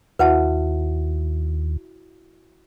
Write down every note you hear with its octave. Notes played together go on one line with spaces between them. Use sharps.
D#2 E4 F#4 B4 E5 F#5 A5